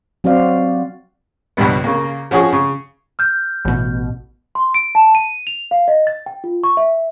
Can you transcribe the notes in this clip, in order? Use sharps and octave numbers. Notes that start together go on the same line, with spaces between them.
F#3 C4 F#4 C5 D5 F5
C#2 G2 B2 G3 B3
C#3 A#3
F3 C#4 F#4 G#4 C#6
C#3
F6 G6
A1 B2
C6
D7
A5
D#7
F7
F5
D#5
A6
G5
F4
C#6
E5